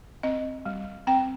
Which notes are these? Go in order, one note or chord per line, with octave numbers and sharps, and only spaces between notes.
C4 D#5
G3
C4 G5